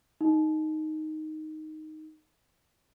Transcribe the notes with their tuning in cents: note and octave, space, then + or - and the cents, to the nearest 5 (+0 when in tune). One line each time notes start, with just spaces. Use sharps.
D#4 +0